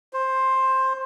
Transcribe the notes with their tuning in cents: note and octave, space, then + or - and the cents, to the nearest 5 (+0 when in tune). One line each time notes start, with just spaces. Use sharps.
C5 +10